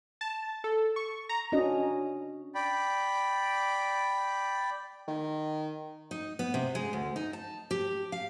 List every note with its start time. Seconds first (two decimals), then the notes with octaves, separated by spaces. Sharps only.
0.21 A5
0.64 A4
0.96 C#6
1.29 A#5
1.52 C#4 D4 F#4 D#5
2.55 D5 G5 B5
5.08 D#3
6.11 D#4
6.39 B3
6.54 C3
6.75 G#3
6.93 D2
7.16 D#4
7.33 A5
7.71 G4
8.12 F5